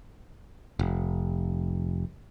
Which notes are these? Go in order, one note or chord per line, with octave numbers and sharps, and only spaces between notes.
F1